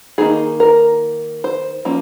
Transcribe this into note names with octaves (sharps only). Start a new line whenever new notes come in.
D#3 A#3 D#4 G#4
A#4
C5
F3 A#3 C#4